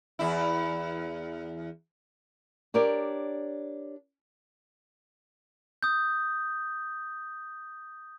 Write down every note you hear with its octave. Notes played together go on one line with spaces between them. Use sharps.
E2 E4
D4 G4 A#4 C#5 D5
D#6 G6